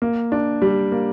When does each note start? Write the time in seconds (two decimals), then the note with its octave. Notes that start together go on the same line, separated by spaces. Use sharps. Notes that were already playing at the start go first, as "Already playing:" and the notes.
0.02 A#3
0.32 D4
0.62 G3
0.92 A#3